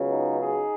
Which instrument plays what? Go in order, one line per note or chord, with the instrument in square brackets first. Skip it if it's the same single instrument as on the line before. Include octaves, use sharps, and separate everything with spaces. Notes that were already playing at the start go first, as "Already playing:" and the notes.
Already playing: [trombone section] C#2 C#3 F#3 B3
D#4
D#4 G#4